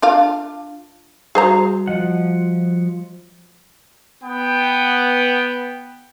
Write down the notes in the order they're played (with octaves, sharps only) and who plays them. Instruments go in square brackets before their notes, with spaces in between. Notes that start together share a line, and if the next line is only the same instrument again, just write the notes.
[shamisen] D4 F4 F5
[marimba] G3 F#4 [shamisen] G#4 C5 A#5
[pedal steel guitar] F3 F#5 [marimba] D#5
[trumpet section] B3 G5